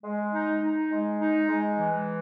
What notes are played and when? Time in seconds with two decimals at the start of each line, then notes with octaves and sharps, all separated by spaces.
0.03 G#3
0.33 D#4
0.61 D#4
0.91 G#3
1.20 D#4
1.48 G#3
1.78 E3